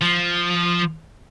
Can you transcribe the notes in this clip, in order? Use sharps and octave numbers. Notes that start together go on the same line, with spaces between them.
F3